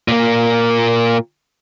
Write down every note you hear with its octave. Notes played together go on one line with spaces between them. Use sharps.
A#2 A#3